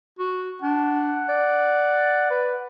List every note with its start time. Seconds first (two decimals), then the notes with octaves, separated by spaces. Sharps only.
0.19 F#4
0.62 D4 F#5
1.29 D5
2.31 B4